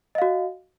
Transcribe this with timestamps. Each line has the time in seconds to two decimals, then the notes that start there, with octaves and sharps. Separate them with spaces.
0.15 D#5
0.18 F5
0.22 F#4